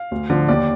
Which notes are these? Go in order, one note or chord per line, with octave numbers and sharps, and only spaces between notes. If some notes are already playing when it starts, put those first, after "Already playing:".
Already playing: F5
D2
D3 F3
D#2 D5